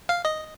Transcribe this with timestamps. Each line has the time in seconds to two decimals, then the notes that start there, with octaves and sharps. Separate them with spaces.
0.09 F5
0.25 D#5